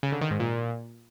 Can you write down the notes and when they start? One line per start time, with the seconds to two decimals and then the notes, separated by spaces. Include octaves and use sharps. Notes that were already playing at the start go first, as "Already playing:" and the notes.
0.03 C#3
0.12 D3
0.21 D#3
0.30 G#2
0.40 A#2